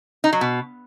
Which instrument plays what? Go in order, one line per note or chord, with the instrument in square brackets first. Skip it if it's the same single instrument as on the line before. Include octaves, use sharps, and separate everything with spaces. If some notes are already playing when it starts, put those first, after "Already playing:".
[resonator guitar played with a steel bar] D#4
F#3
B2